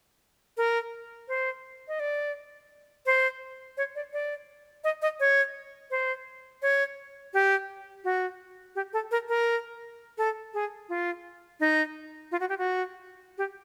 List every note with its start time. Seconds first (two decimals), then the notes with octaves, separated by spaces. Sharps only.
0.57 A#4
1.28 C5
1.88 D#5
2.00 D5
3.06 C5
3.77 C#5
3.95 D5
4.13 D5
4.84 D#5
5.02 D#5
5.20 C#5
5.91 C5
6.62 C#5
7.34 G4
8.04 F#4
8.75 G4
8.93 A4
9.11 A#4
9.29 A#4
10.18 A4
10.54 G#4
10.89 F4
11.60 D#4
12.32 F4
12.40 F#4
12.49 G4
12.58 F#4
13.38 G4